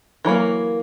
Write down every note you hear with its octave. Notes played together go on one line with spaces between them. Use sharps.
E3 F#3 A3 A#3